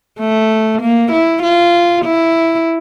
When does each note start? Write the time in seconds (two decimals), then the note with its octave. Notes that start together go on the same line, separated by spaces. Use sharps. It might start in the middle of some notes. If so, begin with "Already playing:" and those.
0.19 A3
0.81 A#3
1.12 E4
1.42 F4
2.05 E4